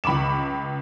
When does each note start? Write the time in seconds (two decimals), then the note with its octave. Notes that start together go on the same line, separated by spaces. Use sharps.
0.04 C#2 B5 C#6 D6 E7